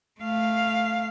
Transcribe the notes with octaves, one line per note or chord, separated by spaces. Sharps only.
A3 F5